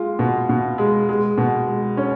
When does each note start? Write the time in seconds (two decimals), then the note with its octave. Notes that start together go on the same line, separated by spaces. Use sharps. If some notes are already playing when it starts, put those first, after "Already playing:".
Already playing: G#3 F4
0.19 B2
0.49 B2
0.78 G#3
1.09 G#3
1.38 B2
1.68 G#3
1.97 C#4